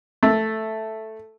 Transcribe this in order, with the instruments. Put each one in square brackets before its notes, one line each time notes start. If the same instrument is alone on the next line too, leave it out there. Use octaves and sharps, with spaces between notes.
[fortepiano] A3